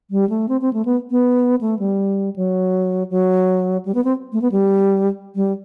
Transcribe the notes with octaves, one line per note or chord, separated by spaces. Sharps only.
G3
A3
C4
C4
A3
B3
B3
A3
G3
F#3
F#3
G3
B3
C4
A3
B3
G3
G3